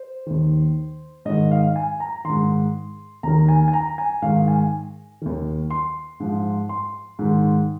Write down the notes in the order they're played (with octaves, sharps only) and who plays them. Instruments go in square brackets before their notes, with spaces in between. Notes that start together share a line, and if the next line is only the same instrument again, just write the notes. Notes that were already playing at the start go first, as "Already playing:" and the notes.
Already playing: [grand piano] C5
D#2 D#3
G#2 D#3 D#5
F5
F5
G#5
A#5
G#2 D#3 C6
D#2 D#3 A#5
G#5
G#5
A#5
G#5
G#2 D#3 F5
G#5
D#2 D#3
C6
G#2 F3
C6
G#2 D#3